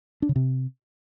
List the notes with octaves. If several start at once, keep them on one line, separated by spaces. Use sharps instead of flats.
D4
C#3
C3